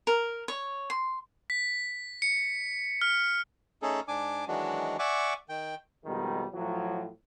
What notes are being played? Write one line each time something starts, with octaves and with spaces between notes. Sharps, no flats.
A#4
C#5
C6
B6
C#7
F6
A3 C#4 D#4 G#4 A4
G#2 D4 G#5 D6
D#3 E3 F#3 G#3 D4 F#4
D5 E5 F#5 G#5 C#6 D6
D#3 G5
F2 B2 D#3 G3 G#3
A2 F3 F#3